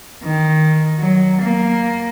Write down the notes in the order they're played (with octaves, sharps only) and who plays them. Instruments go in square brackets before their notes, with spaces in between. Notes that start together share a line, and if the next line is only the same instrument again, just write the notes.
[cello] D#3
F#3
A#3